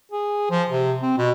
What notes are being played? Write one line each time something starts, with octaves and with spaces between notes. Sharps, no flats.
G#4
F3
C3
C4
B2